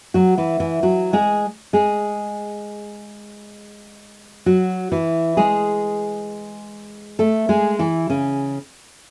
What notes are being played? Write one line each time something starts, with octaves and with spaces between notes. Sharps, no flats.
F#3 F#4
E3 E4
E3 E4
F#3 F#4
G#3 G#4
G#3 G#4
F#3 F#4
E3 E4
G#3 G#4
A3 A4
G#3 G#4
E3 E4
C#3 C#4